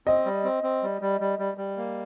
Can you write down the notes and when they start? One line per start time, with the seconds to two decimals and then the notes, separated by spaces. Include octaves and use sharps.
0.07 C4 D#5
0.25 G3
0.44 C4
0.63 C4
0.83 G3
1.01 G3
1.21 G3
1.39 G3
1.57 G3
1.77 A#3